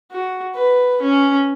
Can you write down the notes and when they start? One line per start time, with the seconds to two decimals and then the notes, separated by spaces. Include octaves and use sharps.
0.11 F#4
0.55 B4
1.02 C#4